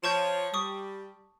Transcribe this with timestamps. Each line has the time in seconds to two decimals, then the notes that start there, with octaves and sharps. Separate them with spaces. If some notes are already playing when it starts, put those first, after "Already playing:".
0.04 F3 C#5 A5 C#6 G6
0.54 G3 C#6 D#6